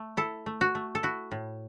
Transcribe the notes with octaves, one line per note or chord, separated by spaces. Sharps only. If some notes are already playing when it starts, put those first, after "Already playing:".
Already playing: A3
E4 A4
A3
F#4
A3
A4
E4 F#4
A2